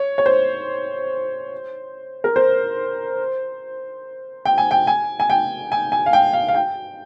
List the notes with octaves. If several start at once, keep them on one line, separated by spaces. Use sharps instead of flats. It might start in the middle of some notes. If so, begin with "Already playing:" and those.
Already playing: C#5
C#5
C5
A#4
C5
G5
G#5
G5
G#5
G#5
G5
G#5
G#5
F5
G5
F5
F5
G5